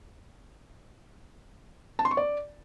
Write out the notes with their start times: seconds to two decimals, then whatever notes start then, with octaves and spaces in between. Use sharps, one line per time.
1.99 A5
2.05 C6
2.11 C#6
2.17 D5